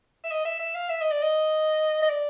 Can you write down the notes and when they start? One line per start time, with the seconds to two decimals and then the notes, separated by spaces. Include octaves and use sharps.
0.24 E5
0.31 D#5
0.45 E5
0.60 E5
0.75 F5
0.89 E5
1.01 D#5
1.12 D5
1.23 D#5
2.02 D#5
2.10 D5